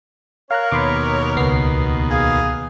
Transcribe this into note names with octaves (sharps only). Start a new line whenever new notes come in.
A#4 C#5 F5 A#5 F#6
D#2 B2 B5 C6 D6
C#2 B3 C7
G#4 F5